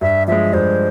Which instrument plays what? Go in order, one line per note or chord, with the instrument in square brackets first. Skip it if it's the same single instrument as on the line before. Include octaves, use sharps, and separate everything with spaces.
[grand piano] G2 [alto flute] E5
[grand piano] F3 G#3 [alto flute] E5
[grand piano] G2 [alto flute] C5